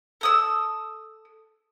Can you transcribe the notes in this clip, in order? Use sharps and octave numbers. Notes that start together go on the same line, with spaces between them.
A4 D#6 E6